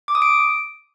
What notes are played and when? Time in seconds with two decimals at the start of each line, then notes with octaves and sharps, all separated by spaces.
0.08 D6
0.15 D#6
0.22 D7